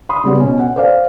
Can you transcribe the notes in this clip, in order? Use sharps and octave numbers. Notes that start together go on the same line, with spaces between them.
B5 C6 D#6
C#3 G3 B3
B2 C#4
F#5
C5 D5 F5